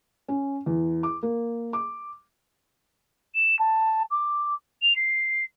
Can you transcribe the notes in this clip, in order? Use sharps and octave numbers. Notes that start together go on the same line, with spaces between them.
C#4
E2
D6
A#3
D6
E7
A5
D6
F7
C7